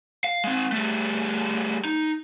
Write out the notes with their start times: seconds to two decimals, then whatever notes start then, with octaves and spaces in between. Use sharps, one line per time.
0.24 F5
0.44 G#3 C4
0.72 G3 A3
1.85 D#4